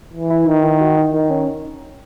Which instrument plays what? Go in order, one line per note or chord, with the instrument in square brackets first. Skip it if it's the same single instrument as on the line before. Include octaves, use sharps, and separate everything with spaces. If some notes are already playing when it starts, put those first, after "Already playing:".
[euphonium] E3
[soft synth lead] E4
[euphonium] D#3 [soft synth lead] D#4
[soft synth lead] E4
F#4
D#4
[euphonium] D#3 [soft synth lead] D#4
[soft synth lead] C#4